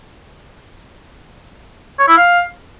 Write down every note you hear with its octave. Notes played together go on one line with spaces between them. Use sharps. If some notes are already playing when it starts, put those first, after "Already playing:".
C#5
E4
F5